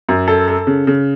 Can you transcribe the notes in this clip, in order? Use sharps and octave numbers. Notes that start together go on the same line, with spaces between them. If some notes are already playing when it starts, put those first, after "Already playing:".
F#2
A4
A4
C#3
C#3